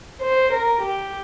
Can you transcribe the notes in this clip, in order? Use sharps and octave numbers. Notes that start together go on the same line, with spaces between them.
C5
A#4
G4